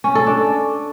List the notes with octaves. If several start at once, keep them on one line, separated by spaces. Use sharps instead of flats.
C#4
A4
D4